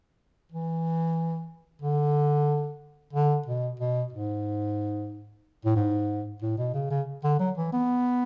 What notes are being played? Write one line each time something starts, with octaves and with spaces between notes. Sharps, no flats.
E3
D3
D3
B2
B2
G#2
A2
G#2
A2
B2
C#3
C#3
D3
F#3
E3
B3